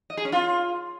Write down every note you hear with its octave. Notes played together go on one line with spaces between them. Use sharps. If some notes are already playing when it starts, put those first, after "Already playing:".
D#5
G#4
C#4
F4